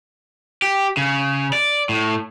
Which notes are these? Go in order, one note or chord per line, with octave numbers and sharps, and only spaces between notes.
G4
C#3
D5
A2